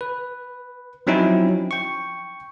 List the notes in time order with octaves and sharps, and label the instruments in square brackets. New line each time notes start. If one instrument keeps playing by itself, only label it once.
[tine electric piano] B4
F3 F#3 C4 C#4 D#4 E4
G5 C#6